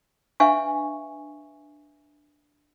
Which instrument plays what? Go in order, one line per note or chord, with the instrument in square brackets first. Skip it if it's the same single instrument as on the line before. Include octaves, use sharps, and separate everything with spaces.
[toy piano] D4 B4 E5 F5 G#5 C#6